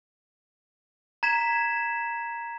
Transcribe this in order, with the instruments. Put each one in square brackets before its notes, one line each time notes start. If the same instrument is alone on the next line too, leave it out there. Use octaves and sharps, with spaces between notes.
[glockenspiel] A#5 G#6 B6 E7